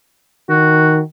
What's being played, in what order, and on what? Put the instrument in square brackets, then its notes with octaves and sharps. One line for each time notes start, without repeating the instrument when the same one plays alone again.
[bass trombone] D#3 [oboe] F#4